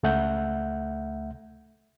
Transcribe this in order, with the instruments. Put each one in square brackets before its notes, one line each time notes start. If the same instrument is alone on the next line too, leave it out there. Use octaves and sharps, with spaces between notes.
[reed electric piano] C#2 A3 E5 F#5 G6